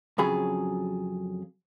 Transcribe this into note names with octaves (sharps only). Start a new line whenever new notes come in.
F2 C#3 F#3 F4 G#4 B5